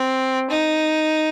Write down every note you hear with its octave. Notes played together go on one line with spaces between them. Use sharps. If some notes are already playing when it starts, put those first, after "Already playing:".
Already playing: C4
D#4